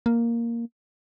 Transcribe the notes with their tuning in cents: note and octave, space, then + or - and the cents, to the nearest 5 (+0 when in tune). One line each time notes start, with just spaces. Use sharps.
A#3 +0